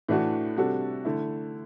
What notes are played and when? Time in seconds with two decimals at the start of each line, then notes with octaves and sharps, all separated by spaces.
0.08 A2 E3 A3 D4 F#4
0.57 C3 G3 D4 F#4 A4
1.05 D3 A3 E4